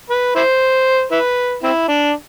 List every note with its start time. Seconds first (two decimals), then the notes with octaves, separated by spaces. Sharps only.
0.10 B4
0.36 E4 C5
1.11 E4 B4
1.63 C4 E4
1.88 D4